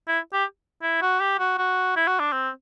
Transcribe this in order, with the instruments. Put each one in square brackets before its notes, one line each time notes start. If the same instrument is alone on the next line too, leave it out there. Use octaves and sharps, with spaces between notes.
[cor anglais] E4
G4
E4
F#4
G4
F#4
F#4
E4
F#4
D4
C4